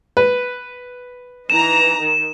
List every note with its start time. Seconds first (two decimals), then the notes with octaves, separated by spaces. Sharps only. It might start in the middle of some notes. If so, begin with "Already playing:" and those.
0.17 B4
1.50 E3 D#4 A#5 E7
2.01 D#3